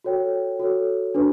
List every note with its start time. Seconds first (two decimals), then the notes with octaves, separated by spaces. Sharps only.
0.04 F#4 A4 C#5 G5
0.59 F#4 A4 C#5
1.14 D4 F#4 B4